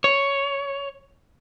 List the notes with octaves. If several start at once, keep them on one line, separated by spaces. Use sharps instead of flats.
C#5